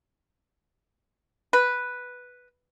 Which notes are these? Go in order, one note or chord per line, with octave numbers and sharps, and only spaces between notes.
B4